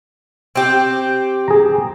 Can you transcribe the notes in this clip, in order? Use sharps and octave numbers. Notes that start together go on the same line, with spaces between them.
C4 G4
G#4 A#5